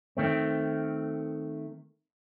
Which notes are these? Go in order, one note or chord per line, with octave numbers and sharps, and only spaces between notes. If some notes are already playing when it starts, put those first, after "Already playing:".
D#3 A3 C4